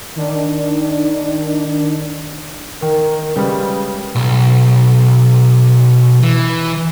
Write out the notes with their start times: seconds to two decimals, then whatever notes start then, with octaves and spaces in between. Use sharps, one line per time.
0.16 D#3 D4
2.82 D#3 A#4
3.36 C#3 G3 G#3 B4
4.16 B1
6.23 E3